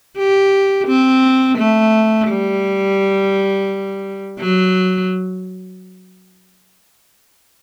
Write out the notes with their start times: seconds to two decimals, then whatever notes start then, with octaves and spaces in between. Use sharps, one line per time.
0.18 G4
0.88 C4
1.58 A3
2.28 G3
4.39 F#3